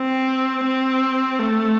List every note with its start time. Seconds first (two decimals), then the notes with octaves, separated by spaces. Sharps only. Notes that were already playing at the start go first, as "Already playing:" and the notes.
Already playing: C4
0.65 C4
1.39 A3